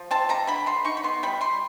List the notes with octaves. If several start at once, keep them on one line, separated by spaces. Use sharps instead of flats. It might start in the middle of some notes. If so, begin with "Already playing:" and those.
Already playing: F3
C4 A5
G3 A#5
D3 B5
D3 C6
D#4 C#6
B5
B3 C6
G3 B5
G3 C6